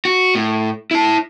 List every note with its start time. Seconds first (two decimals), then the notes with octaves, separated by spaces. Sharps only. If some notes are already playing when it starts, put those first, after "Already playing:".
0.05 F#4
0.35 A2
0.91 E4 A5